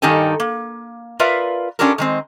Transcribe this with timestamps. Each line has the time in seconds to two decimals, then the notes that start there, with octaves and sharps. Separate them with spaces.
0.02 G2 D#3 D#4 G4 A4 G#5
0.40 A#3
1.19 F4 A#4 B4 D5 E5 F5
1.79 C#4 D4 F4 G4 A4 A#4
1.98 D#3 G#3 C4